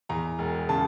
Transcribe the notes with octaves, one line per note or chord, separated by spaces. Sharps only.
E2 A#5
E1
C#3 A5